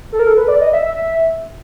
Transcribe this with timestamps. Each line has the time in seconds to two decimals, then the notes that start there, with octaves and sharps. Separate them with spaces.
0.12 A4
0.19 A#4
0.27 A4
0.37 B4
0.48 D5
0.61 D#5
0.73 E5
0.85 E5